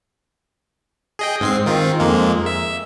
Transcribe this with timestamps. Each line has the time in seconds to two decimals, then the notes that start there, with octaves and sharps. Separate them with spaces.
1.19 G#4 D#5 G5
1.40 G#2 C4 C7
1.66 D#3 C4 F4
2.00 F2 G#3 A#3
2.46 E5